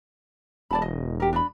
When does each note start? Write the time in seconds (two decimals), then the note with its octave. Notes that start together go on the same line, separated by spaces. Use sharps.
0.71 E1 D5 A5 B5
0.82 D#5
1.20 G4 A#4
1.33 D4 D#5 B5